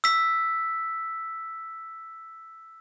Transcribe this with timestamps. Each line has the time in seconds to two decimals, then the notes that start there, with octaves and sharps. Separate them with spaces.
0.04 E6 B6